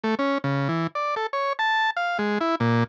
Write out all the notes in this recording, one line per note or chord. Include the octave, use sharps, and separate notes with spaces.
A3
C#4
C#3
E3
D5
A4
C#5
A5
F5
G#3
E4
A#2